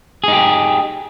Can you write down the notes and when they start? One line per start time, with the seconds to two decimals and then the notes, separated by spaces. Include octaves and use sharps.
0.24 G#4
0.28 D#4
0.32 G4